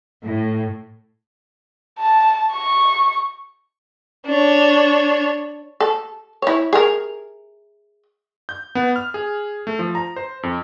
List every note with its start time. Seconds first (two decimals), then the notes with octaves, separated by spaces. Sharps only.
0.23 A2
1.99 A5
2.52 C#6
4.26 D4 C#5
5.80 A4
6.42 E4 C#5
6.73 G#4 A#4
8.49 G6
8.75 B3
8.96 F6
9.14 G#4
9.67 A3
9.79 F3
9.95 A#5
10.16 C5
10.43 F2